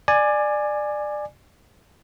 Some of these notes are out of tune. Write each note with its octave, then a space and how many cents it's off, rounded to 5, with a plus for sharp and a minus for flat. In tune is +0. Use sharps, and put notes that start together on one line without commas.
D5 +20 G#5 +0